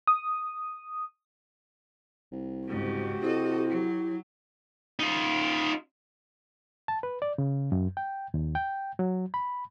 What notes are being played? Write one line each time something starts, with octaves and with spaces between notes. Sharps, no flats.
D#6
C2
G#2 C#3 F#4 G4
C3 E4 A4 D#5
F#3
D#4 F4
A5
B4
D5
C#3
F#2
G5
D#2
G5
F#3
B5